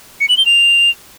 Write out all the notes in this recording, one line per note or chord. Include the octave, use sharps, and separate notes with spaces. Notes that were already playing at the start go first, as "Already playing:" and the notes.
C#7
F#7
G7
F7